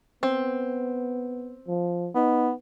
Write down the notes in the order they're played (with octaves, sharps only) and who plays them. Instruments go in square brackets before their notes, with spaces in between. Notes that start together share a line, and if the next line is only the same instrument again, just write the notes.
[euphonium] B3 [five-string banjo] C4
[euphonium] F3
[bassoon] B3 [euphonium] D#4